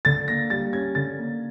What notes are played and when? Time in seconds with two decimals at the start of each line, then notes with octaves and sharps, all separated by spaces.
0.05 D3 A6
0.28 A#3 A#6
0.50 G3 A6
0.73 C#4 G#6
0.95 D3 A6
1.18 A#3